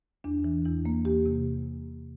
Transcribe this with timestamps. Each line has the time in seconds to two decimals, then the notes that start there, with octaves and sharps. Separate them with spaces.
0.24 E2 D4
0.44 E3
0.65 E2 E4
0.85 A#3
1.05 E2 G4
1.26 C3